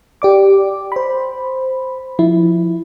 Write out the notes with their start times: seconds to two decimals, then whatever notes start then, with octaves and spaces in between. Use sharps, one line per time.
0.22 G4 D5 D6
0.92 C5 B5
2.19 F3 E4